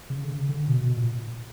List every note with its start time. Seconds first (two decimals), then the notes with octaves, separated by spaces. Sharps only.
0.10 C#3
0.24 D3
0.28 C#3
0.49 D3
0.68 B2
0.81 B2
0.97 A#2